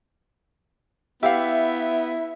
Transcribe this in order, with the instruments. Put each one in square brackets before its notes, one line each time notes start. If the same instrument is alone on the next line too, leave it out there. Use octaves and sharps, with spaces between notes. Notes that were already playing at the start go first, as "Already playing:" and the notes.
[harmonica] B3 [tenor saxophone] E4 [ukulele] G4 F5 [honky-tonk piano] E5